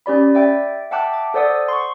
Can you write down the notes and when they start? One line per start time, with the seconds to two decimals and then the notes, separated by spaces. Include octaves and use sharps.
0.06 C#4 G4 D5 B5
0.35 D5 E5 G5
0.91 E5 F#5 G5 A5 D6 F#6
1.13 D6
1.34 A4 C5 D5 F#5 D#6
1.68 C6 C#6